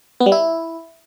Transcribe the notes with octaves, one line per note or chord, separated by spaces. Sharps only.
B3
G3
E4